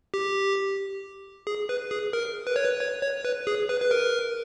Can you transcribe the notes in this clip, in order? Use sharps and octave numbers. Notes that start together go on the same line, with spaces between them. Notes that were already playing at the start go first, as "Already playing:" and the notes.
G4
G#4
B4
G#4
A#4
B4
C#5
B4
C#5
C#5
B4
G#4
B4
B4
A#4